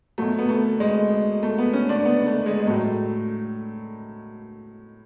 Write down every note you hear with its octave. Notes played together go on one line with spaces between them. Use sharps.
B2 F#3 A3
B3
A3
G#3
A3
B3
C#4
D4
B3
A3
G#3
G#3
A2 F#3 A3